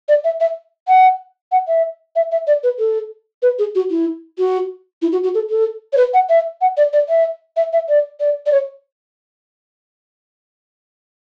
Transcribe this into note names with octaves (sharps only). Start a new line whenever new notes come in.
D5
E5
E5
F#5
F#5
E5
E5
E5
D5
B4
A4
B4
G#4
F#4
E4
F#4
E4
F#4
F#4
A4
A4
C#5
B4
F#5
E5
F#5
D5
D5
E5
E5
E5
D5
D5
D5
C#5